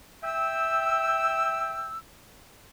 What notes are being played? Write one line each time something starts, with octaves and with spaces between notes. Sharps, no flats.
E5 G5 E6